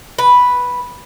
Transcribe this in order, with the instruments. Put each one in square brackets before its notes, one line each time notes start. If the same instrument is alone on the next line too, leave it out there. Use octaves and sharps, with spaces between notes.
[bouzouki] B4